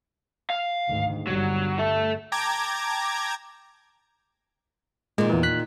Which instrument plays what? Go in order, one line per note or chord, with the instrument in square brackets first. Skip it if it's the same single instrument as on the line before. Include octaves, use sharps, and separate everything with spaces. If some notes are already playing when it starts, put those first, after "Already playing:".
[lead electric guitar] F5
[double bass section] D2 G#2 D#3
[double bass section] G1 G2 G3 [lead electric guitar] F#3
[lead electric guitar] A4 E5
[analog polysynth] G5 A5 A#5 D6 G#6
[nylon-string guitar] A#2 D#3 [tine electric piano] G#3
[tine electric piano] E2 E3
F#6 B6